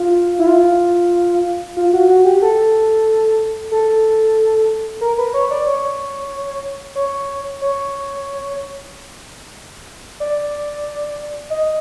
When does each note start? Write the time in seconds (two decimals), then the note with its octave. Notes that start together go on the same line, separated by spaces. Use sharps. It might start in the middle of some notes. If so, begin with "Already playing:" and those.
Already playing: F4
0.39 E4
0.46 F4
1.77 F4
1.93 F#4
2.09 F#4
2.25 G4
2.42 A4
3.72 A4
5.01 A#4
5.18 B4
5.34 C#5
5.50 D5
5.66 C#5
6.95 C#5
7.62 C#5
10.20 D5
11.50 D#5